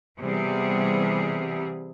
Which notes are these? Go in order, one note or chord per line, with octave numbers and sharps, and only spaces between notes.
C3 E3 G3 B3 G#4